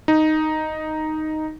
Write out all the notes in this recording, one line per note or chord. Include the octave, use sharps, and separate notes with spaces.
D#4